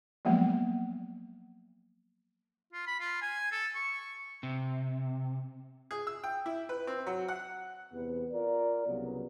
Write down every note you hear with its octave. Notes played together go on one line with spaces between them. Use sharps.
F3 F#3 G#3 A#3 B3
F4
B5
F4
G#5
A4
C#6
C3
G#4
E6
G5
E4
B4
C4
F#3
F#5
E2 C3 B3
F4 A#4 D5
C2 C#3 F#3 B3